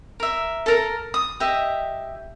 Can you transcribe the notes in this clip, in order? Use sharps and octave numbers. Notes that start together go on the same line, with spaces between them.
A#4 E5
A4 A#4
D#6
G4 D#5 E5